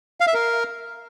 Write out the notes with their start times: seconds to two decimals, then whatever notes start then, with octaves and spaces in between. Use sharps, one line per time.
0.20 F5
0.27 E5
0.34 A#4